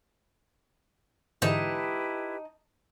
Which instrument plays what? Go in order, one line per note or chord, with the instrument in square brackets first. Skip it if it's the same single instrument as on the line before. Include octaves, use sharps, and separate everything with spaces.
[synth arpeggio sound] G#2 D3 E3 [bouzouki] D#4 A5 [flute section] E4 G4 B4